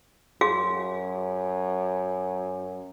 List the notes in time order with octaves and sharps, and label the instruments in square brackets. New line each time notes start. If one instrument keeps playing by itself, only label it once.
[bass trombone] F#2 [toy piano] F#4 G#4 F5